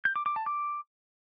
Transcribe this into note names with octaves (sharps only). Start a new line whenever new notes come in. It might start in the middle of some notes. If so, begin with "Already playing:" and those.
G6
D6
D6
A5
D6